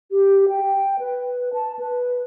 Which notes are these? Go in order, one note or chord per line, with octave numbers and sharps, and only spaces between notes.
G4
G5
B4
A5
B4